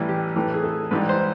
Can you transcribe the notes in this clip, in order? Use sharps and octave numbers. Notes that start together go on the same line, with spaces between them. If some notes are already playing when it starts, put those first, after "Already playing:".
Already playing: A1 A2 E3 G3
G4
A2 E3 A3 G4
G#4
A4
G#2 E3 G3 B4
C5